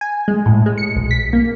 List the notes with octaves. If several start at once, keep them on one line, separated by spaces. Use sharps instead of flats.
G#5
G#3
A2
G#3
C#7
B1
B6
A#3